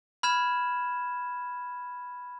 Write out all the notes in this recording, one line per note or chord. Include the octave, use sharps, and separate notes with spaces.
B5 F6 G#6 E7